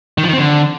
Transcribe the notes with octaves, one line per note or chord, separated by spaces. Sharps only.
D#3
F3
D#3
C4
D3